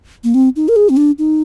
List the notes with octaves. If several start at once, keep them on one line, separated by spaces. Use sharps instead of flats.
A#3
C4
D#4
A#4
G#4
C4
D4
D#4